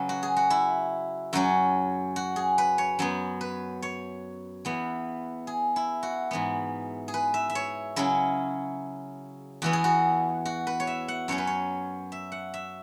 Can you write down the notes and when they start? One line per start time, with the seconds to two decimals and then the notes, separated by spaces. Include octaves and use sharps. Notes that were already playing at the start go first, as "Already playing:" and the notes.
Already playing: C#3 F#3 C#4 B4
0.09 F#4
0.23 G#4
0.37 F#4
0.50 E4
1.33 F#2 F#3 C#4 F#4
2.16 F#4
2.36 G#4
2.58 B4
2.78 C#5
2.99 F#2 F#3 B3
3.41 B4
3.82 C#5
4.65 E2 E3 B3
5.47 G#4
5.76 E4
6.03 F#4
6.31 G#2 E3 B3
7.08 G#4
7.14 B4
7.34 E5
7.50 E5
7.55 C#5
7.96 C#3 F#3 C#4 E4
9.62 E2 E3 B3 F#4
9.73 G#4
9.84 F#4
10.45 F#4
10.67 B4
10.80 C#5
10.87 E5
11.08 F#5
11.28 F#2 F#3 C#4 C#5
11.38 B4
11.47 C#5
12.12 E5
12.32 F#5
12.54 E5